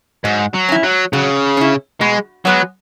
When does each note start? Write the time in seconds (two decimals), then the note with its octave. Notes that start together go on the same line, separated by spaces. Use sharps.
0.24 G#2 F#3
0.54 F#3
0.69 C#4 E4
0.83 F#3
1.13 C#3 F#3
1.57 C#4 E4
2.01 B2 G#3
2.45 F#3 G#3 B3 F#4